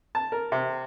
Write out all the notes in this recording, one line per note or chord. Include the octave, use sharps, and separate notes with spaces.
A5
A#4
C3